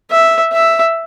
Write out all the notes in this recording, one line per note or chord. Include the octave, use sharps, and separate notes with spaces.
E5
E5